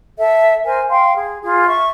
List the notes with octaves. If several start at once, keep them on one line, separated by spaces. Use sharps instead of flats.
A4 E5
A#4 C5 G#5
F5 G5 C6
G#4
F4 G#4
E5 C#6